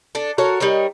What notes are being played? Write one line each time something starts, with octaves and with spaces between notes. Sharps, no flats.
D4 A4
F#4 A4 A#4 C#5
G3 D#4 A#4 C#5